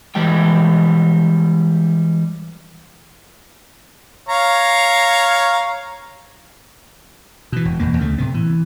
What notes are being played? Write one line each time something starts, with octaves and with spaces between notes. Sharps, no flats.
E3 G3 G#3 G5
C#5 F5 A#5
B2 E3
E1
F1 E2 B2 A#3
D2 C#3 A3
A2 C3 B3
E3